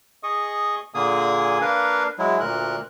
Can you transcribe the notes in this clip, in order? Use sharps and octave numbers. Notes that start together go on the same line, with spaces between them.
G#4 D#5 C#6 D#6
A#2 D3 A#3 G#4 G#5 D#6
A#3 D4 A#4 B4 F5
F#3 G#3 E4
D2 A#2 A#4 F#6